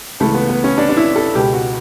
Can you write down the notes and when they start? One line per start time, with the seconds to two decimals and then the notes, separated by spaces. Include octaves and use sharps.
0.20 C#2 C#3 E3 A3
0.34 B3
0.49 B3
0.64 C#4
0.78 D4
0.89 D4
0.96 E4
1.16 A4
1.35 C#2 B2 G4
1.54 F#4